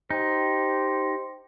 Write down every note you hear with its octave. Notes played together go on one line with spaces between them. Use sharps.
D#4 G4 C5